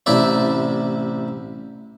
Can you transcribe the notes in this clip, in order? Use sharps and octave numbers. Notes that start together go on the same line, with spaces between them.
A1 C3 E4 D5 E5